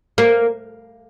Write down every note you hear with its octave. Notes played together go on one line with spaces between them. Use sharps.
A#3